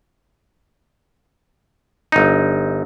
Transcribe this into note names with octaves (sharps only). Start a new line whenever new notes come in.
G1 D#4